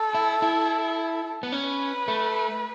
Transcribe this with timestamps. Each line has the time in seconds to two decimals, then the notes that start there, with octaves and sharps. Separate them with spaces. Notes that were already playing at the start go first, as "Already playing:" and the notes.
Already playing: A4
0.14 E4
0.42 E4
1.43 B3
1.52 C#4 B4
2.08 A3